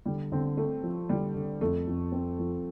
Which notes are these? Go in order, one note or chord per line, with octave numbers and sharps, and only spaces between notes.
D3 G3
D3 C4
A3 C4
F3
D3 G3
D3
F2 A3
F2
C4
F3